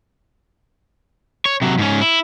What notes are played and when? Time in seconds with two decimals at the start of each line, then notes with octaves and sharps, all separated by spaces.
1.46 C#5
1.62 C3 F#3
1.79 G#2 C#4
2.01 E4